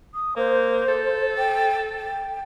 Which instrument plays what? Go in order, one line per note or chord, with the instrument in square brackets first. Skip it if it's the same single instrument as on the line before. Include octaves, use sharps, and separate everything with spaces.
[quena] D#6
[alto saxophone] A#3 [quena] C5
[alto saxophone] A4
[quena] G5
G5